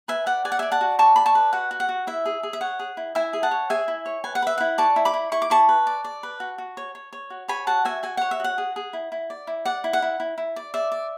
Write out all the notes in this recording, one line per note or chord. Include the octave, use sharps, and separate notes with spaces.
B4 E5 G#5
D5 F#5
D5 G#5
F#5
D5 E5 G#5
F#5 A5
F#4
D5 A5 C#6
D5 B5
A5 C#6
B4
F#4 F#5
F#4
F#5
F#4
E4 E5
G#4
G#4
E5
C#5 F#5
G#4
E4
E4 E5 G#5
G#4
F#5 A5
C#5
G#4 E5 G#5
E4
C#5
B4 G#5
F#5
B4 E5
E4 F#5
D5 A5 C#6
E4
B5 D6
E4
E4 C#6
D6
E4 A5 C#6
B4
D5
D5
B4
F#4
F#4
C#5
C#5
C#5
F#4
C#5 G#5 B5
F#4 F#5 A5
F#4 E5 G#5
F#4 G#5
C#5 F#5
E5
F#4 F#5
G#4
G#4
E4
E4
D5
E4
D5 F#5
E4
F#5
E4
E4
E4
D5
D5 E5
D5